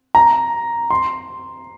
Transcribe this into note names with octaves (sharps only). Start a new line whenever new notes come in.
A#5
C6